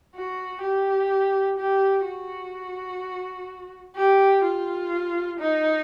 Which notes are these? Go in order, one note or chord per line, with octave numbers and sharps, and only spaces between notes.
F#4
G4
G4
F#4
G4
F4
D#4